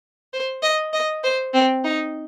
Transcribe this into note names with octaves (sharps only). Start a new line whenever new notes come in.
C5
D#5
D#5
C5
C4
D#4